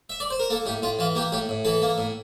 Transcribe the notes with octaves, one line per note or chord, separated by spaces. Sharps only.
E5
D5
C5
A#4
A#3 A4
A2 G4
A2 F4
E3 F4
A#3 G4
A2 G4
A2
E3 A4
A#3
A2